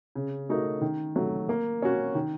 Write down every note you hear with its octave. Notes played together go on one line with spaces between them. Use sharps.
C#3
A3 D#4 F#4 A#4
D#3
F#3 A3
A#3
C#4 F#4
D#3